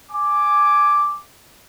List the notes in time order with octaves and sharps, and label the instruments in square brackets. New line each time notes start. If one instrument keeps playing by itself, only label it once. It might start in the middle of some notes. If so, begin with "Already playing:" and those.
[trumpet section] G#5 D6